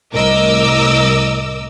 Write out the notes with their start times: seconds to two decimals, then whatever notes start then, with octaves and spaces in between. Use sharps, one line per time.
0.13 C2 A2 A#4 D#5 D6 E6